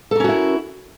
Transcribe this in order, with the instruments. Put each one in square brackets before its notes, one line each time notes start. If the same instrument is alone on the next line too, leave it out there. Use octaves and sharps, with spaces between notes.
[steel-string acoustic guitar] A4
A#4
C#4
F#4
E4